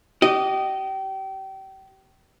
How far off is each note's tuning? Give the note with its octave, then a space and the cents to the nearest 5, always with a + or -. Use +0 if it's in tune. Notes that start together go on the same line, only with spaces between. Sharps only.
G4 -30 D#5 -10